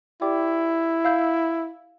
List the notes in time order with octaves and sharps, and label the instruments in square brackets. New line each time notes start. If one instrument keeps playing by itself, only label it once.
[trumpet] E4 [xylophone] G4 D5 G5 D6
[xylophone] F5 B5 E6 G6